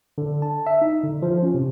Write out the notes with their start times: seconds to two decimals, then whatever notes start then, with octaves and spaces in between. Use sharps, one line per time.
0.18 D3
0.42 A5
0.66 E5
0.82 D#4
1.04 D3
1.22 F3
1.43 C#4
1.54 C3